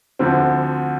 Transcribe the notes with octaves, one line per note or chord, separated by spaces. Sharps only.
D2 D3 F3 C4